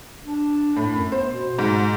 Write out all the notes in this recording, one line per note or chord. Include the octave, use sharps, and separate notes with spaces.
D4
A2
F#2
B3 C5
B2
G#2